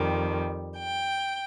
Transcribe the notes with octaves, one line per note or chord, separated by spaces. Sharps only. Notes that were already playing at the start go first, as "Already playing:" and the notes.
Already playing: F2 D#3 G3
G5